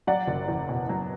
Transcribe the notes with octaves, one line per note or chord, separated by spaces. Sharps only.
F#3 D5 F#5
F#1
E2
B2
F#3